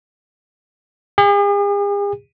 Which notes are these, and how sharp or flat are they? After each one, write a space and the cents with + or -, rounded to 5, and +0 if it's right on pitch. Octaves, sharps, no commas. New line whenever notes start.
G#4 -45